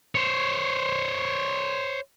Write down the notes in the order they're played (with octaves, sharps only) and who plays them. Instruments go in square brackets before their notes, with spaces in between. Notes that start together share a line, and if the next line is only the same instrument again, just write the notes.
[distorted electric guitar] C5 C#5